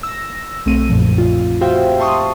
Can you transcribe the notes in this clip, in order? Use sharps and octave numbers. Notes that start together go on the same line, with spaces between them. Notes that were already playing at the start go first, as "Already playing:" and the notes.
E6 A#6
B1 A3 C4 D#7
F#2 A#2 F3
F4
F#4 G4 C5 E5 F5 G5
E5 A5 C6 C#6 D#6